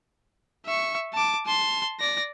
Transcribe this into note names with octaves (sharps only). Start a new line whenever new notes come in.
E5 C#6
A5 D6
A5 C6
D5 A#6